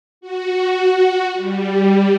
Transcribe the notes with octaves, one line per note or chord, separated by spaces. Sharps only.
F#4
G3